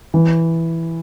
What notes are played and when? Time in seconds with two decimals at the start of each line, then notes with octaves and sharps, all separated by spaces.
0.14 E3